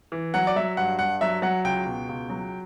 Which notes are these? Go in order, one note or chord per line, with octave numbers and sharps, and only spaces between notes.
E3
F#3 F#5
D5
F#3 E5
G2 F#5
G2 F#5
F#3 E5
F#3 F#5
C#2 G5
B2
C#2
F#3